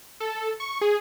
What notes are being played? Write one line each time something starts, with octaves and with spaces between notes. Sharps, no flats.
A4
C#6
G#4